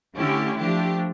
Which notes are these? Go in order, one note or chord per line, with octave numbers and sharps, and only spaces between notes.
D3 A3 C#4 E4 G4
F3 A3 D4 G4